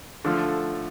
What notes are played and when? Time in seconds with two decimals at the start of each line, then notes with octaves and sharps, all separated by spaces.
0.25 D3 F3 A3 F4